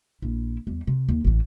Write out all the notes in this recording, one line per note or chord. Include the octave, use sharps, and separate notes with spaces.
A#1 E4
E2 G3
C3
D#2
A1 E3